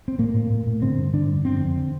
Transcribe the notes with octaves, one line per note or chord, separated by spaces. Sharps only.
C4
A2 A#3
A2
A2
A2
D3 C4
G2
D3 D4
G2
D3 C4
F2
D3